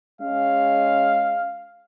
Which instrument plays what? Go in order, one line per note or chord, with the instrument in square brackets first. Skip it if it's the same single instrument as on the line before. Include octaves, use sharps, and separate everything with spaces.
[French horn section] G#3 C#4 [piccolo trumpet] F5